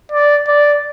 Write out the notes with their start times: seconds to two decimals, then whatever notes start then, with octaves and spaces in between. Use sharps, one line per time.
0.12 D5
0.48 D5